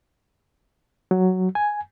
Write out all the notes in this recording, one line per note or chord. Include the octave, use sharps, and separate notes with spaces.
F#3
G#5